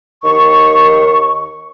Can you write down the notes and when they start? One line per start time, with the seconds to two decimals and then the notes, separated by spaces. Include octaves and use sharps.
0.24 D#2 D#3 C#6